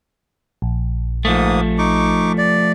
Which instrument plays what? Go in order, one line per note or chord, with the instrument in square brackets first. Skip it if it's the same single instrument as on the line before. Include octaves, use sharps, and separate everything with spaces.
[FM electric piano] A#1
[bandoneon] G#2 A#3 D#6 [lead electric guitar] F3 A3
[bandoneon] D#4 C#6 D6
D5